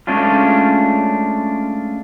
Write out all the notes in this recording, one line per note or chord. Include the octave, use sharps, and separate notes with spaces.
G#3 A3 C#4 D4 F4